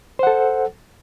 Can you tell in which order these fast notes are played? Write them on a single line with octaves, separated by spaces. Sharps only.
C5 F#5 A4